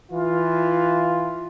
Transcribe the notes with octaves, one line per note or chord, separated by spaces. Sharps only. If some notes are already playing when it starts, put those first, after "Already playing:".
E3 F4